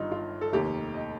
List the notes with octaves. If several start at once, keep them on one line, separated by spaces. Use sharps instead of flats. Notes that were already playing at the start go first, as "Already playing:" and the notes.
Already playing: G1 G2 D#3 D#4 F4
F4
A4
F1 D#2 D#3 G4
D#5